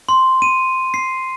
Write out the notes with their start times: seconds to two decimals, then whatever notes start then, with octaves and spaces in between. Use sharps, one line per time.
0.09 C6
0.42 D#7
0.94 C7